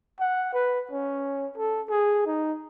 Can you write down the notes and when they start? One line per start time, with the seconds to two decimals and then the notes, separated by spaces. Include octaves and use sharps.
0.20 F#5
0.53 B4
0.92 C#4
1.57 A4
1.90 G#4
2.26 D#4